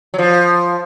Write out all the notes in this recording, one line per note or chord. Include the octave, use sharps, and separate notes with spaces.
F#3
F3